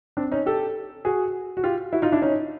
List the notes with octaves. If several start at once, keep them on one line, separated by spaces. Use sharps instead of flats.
C4 D4
C#4 D#4
G4 A4
F#4 G#4
F#4
F4 G4
E4 F#4
D#4 F4
D4 E4
C#4 D#4